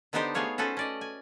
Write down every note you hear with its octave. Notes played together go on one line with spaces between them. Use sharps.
D3 B3 D4 D#4 G4 C5
A3 B3 G#4 C#5 F5
C#4 F#4 A4 B4 C5
C#4 D5 D#5
G#5